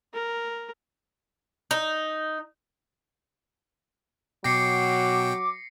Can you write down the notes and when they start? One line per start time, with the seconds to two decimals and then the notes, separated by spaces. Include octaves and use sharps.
0.13 A#4
1.71 D#4
4.44 B2 F#3 G5 D6 A#6 C7 C#7